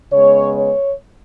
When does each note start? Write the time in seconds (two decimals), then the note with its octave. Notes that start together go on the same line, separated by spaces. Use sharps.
0.12 C#3 G#3 B3 C#5
0.54 C#5